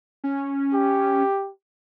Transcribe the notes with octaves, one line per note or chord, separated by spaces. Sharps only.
C#4
G4